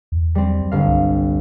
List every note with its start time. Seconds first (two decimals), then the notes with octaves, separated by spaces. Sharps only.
0.12 E2
0.35 G3 C4
0.72 G1 F5
0.88 C2